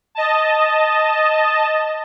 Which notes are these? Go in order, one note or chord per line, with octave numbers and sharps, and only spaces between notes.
D#5 A5